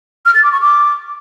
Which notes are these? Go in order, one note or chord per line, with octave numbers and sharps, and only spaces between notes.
F6
A6
D6
C#6
D6